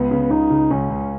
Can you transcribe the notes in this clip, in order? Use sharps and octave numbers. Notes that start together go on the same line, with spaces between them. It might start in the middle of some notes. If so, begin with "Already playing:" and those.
Already playing: C#2 B3
C#3
C#2 D#4
C#3
C#2 C#4
C#2